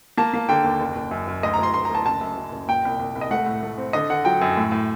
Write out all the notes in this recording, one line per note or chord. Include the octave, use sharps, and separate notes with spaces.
A#3 A5
A#3
D3 G5
D#2
F#1
F#1
F#2
F#2
D2 D#5
A#5
D2 C6
D2 C6
A#5
D2 A5
F#1 A5
F#2
F#2
F#1
A#2 G5
C2
C2
C2
D#5
A3 F#5
A2
A3
C4
D3 D#5
D3 F#5
F#3 G5
F#2
A2
A2